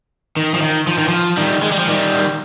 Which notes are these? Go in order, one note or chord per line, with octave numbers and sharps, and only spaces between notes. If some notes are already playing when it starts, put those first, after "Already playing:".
D#3
F3
D#3
F3
D#3
F3
D#3 G3
G#3
G3
F3
D#3 G3